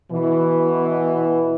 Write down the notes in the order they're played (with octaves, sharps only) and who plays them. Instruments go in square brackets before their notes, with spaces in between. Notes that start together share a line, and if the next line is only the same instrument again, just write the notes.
[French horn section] B2 E3